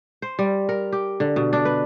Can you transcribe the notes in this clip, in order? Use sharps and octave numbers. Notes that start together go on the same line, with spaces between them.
C5
G3
A#4
G4
D3
B2
D4
B4